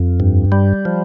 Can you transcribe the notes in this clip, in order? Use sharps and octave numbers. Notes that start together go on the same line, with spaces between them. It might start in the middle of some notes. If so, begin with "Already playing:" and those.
Already playing: F2
G2
G3
F3